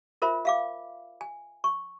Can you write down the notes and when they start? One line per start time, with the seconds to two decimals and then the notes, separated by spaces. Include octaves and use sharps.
0.22 F4 A#4 C5 E5 B5
0.45 E5 F5 D6
1.21 G#5
1.64 C#6